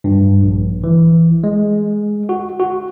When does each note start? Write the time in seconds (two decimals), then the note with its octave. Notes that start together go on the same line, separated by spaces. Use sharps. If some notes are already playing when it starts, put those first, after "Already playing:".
0.04 G2
0.43 A#1
0.84 E3
1.44 G#3
2.29 F#4
2.60 F#4